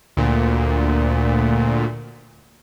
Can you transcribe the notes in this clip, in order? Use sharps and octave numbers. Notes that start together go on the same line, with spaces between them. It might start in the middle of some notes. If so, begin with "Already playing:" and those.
D2 A#2